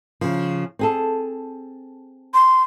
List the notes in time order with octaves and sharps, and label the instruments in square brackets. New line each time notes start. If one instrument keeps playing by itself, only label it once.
[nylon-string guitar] C#3 F3
C4 G#4 A4
[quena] C6